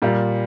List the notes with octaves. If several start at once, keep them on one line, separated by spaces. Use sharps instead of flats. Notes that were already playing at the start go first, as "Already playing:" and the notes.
A#2 G3 A#3 F4